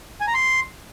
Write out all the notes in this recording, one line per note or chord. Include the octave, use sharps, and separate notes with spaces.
G#5
A#5
C6